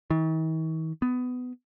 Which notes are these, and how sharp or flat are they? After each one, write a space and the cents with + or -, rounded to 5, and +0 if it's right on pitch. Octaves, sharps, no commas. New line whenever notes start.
D#3 +45
B3 +20